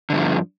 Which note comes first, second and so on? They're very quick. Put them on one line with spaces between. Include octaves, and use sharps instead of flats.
D3 G2 F3